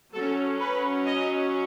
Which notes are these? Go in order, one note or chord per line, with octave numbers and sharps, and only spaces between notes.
F#3 C#4 A4
B4
D#5